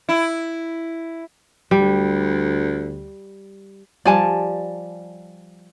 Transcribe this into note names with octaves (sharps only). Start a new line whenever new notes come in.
E4
D2 G3
F3 G3 D5 G#5 A5